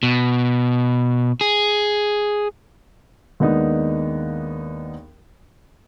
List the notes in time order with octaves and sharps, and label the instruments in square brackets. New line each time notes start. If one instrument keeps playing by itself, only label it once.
[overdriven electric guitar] B2
G#4
[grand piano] D#2 G#3 A#3 B3 D4 D#4